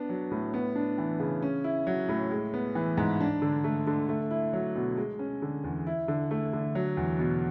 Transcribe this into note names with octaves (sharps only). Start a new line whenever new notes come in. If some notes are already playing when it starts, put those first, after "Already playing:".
Already playing: B3 D4
F#3
A2
B3
D4
E3
C#3
C#4
E4
F#3
A2
G#3
B3
E3
G#2
D4
D3
A3
D3
A3
E4
F#3
B2
G#3
C#4
D3
E2
E4
D3
A3
D3
F#3
E2
B2